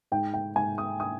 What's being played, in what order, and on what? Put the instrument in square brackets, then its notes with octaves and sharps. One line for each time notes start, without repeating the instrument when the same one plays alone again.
[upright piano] G#2 G5
G5
G#2 G#5
D#6
D4 D#6